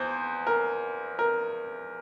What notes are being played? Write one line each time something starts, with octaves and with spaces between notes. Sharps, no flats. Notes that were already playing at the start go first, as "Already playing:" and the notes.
Already playing: E2 C5
A#4
A#4